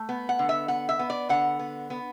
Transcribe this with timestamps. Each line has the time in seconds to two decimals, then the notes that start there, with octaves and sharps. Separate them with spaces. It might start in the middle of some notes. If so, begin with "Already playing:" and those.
Already playing: A3
0.09 B3
0.29 F#5
0.39 D3
0.49 E5
0.68 B3 F#5
0.89 E5
0.99 B3
1.10 D5
1.29 D3 F#5
1.59 B3
1.90 B3